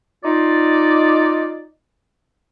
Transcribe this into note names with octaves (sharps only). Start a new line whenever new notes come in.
D#4 F4 D5